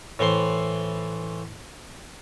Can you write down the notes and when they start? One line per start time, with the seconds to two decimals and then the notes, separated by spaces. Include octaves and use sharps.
0.19 A2 E3 C5 C6